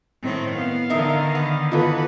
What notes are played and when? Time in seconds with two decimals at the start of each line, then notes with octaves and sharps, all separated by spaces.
0.23 A2 D#3 C4
0.55 B3 F5
0.90 D3 D#3 D#4 A#4 E5
1.35 B3
1.72 E3 B3 D#4 F4 A4 B4